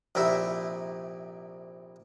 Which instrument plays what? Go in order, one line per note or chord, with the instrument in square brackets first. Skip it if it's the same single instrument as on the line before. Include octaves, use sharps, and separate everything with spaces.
[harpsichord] A#1 C3 D#4 E4